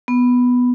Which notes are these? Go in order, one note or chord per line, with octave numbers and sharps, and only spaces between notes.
B3